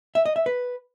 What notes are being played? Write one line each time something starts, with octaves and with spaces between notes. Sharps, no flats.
E5
D#5
E5
B4